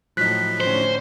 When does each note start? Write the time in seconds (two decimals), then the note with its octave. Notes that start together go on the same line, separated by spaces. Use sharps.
0.17 A2 F3 F#3 D#4 F#6 B6
0.60 A2 D3 C#4 C5